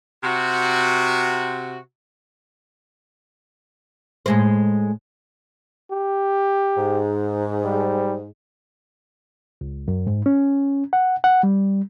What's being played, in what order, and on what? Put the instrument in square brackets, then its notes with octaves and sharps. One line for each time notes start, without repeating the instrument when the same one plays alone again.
[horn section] C3 F#4
[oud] A2 G#3 C5
[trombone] G4
[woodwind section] G#2
[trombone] G3
[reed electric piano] C#2
F#2
G#2
C#4
F#5
F#5
G3